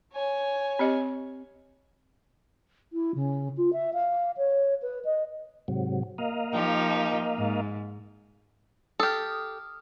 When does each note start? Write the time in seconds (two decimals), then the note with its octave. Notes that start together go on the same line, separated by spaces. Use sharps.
0.13 C#5 G#5
0.79 C4 G4 D#5
2.92 E4
3.14 C#3
3.57 F4
3.72 E5
3.93 F5
4.37 C#5
4.82 B4
5.04 D#5
5.68 G#2 C3 F#3
6.18 A#3 D#5 F5
6.53 F3 D#4 G4
7.36 G#2
9.00 G4 A4 D#6 F6